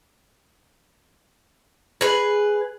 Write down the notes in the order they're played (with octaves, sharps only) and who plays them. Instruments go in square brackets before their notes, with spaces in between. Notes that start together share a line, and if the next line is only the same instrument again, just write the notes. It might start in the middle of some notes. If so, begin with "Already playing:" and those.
[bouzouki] G#4 B4